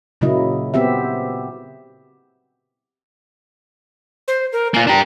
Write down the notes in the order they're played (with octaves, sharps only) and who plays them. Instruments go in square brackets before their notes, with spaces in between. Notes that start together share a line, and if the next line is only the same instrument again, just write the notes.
[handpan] A#2 C#3 F#3 A#3 E4 D#5
B3 C4 G4 E5
[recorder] C5
A#4
[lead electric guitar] A#3 F4 [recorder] G#5
[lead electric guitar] D4 G4 [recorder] A#5